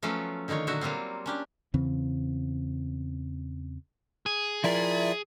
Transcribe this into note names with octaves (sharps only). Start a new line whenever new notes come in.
F3 F#3 A3 B3 C#4 F4
D3 D#3 D#4 F4 C#5
A#2 D3 F#3 F#4 E5
F#3 G3 A#3 C4 F4
C#4 D4 G4
E2 C#3 E3 C4
G#4
F3 E4 A#4 D5 E5